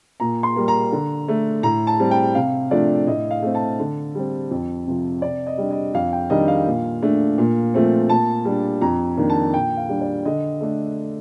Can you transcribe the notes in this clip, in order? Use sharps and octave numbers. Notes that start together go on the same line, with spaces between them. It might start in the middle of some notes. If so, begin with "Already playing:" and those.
A#2 A#5
C6
G3 A#3
A#5
D3
A3 D4
A2 A#5
A5
G3 C4
G5
C3 F5
F3 A3 D4 D5
A2 D#5
F5
A3 C4
A5
D3
G3 C4
F2
C3 F3
C3 D5
D#5
G3 D4
D#5
F2 F5
G5
D#3 G3 D4 D#5
F5
A#2
A3 D4
A#2
F3 A3 C4
A#2 A5
G3 D4
F2 A#5
D#3 A#3 D4
A5
A#2 G5
F5
G3 D4
D5
D3 D#5
A3 D4